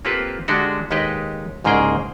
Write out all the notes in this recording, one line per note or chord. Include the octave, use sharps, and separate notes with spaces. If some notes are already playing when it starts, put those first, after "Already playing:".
A#3 C4 F4 G4 A4 B4
D3 G#3 D4 F#4 G4
D#2 G#3 D#4 G4 B4 D#5
C2 G#2 C#3 A#3 G#4 G5